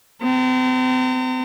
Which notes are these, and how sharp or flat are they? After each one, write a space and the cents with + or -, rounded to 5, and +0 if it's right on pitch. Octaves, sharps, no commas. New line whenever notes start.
C4 -40 A#5 -40